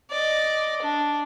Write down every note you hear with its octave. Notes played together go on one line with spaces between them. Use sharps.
D5 D#5
D4